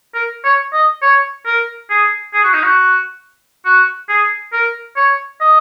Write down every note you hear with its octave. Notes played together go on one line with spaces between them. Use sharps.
A#4
C#5
D#5
C#5
A#4
G#4
G#4
F#4
D#4
F#4
F#4
G#4
A#4
C#5
D#5